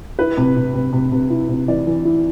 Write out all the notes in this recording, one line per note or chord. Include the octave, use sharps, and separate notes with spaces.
E4 B4
C3
C3
C3
C3
C3
E4
C3
E3 D5
E3
E4